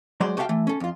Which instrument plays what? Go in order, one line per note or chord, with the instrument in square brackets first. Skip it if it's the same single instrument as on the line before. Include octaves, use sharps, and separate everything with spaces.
[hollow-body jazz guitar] F#3 G#3 C5 D5 C6
F#4 G4 A4 E5 F5 G5
E3 A3
C#4 A4
F2 F4